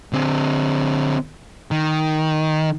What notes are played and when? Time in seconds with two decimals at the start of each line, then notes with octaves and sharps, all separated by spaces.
0.13 D3 C4
1.71 D#3